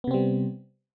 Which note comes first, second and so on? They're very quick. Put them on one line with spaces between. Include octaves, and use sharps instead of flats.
B3 C3 C4 G3